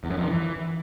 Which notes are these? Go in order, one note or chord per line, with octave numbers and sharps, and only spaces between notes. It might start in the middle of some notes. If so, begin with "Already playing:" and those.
E2
F#2
F2
D#3
E3